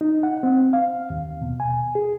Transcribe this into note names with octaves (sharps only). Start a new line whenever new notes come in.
D#4
F#5
C4
F5
D#2
B2
G#5
G#4